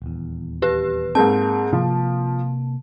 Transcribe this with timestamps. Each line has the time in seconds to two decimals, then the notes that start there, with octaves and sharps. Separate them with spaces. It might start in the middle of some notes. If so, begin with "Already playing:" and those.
0.02 D#1 E2
0.62 G4 B4
1.15 G#2 A#3 C4 A5
1.73 C3 F3 A#3